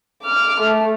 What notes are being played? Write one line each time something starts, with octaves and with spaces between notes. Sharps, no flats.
D6 F6
A3